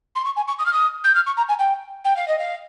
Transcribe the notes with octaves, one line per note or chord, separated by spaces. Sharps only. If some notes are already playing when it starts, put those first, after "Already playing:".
C6
C#6
G#5
C#6
D#6
F6
D#6
G6
F6
C#6
A#5
G#5
G5
G5
F5
D#5
F5